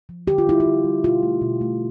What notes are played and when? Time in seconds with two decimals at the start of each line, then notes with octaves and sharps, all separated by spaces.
0.09 F3
0.27 D3 G4
0.38 F4
0.47 G3 E4
0.60 F4
0.66 D3
0.84 G3
1.04 B2 F4
1.23 A3
1.42 B2
1.61 A3